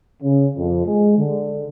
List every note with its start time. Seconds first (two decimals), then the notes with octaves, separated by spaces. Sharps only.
0.23 C#3
0.57 F2
0.85 G#3
1.19 D3